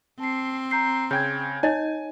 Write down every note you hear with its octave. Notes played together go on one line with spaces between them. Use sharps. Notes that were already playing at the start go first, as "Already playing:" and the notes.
C4 A5 C7
A#5 G6 C7
C#3 G5 G6 G#6
D#4 C#5 D#5 G#5